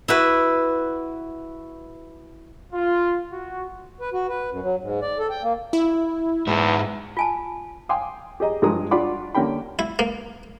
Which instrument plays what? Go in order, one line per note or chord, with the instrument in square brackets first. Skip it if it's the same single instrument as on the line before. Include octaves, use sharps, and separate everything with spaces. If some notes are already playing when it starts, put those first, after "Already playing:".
[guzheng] E4 F#4 B4
[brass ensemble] F4
F#4
[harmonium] B4
F#4
B4
F#2
F#3
G#2
D5
A4
G5
A#3
[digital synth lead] E4
[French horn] E2 [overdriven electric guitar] G#2 E4
[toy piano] F4 G#5 A5
[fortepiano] F5 G5 G#5 C6 D6 D#6
G4 G#4 D#5 A#5
G2 F3 G#3 G#4 A#5 D#6
D4 F4 F#4 F#5 B5 D6
D3 A#3 C#4 G4 G5 B5
[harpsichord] E4
A#3